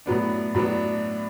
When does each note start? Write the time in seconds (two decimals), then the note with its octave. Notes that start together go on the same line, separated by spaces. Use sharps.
0.06 A2 F#3 B3 D4
0.55 A2 F#3 B3 D4